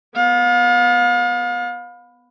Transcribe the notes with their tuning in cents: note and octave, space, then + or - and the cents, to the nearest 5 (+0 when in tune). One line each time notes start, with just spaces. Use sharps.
B3 +5 F5 +40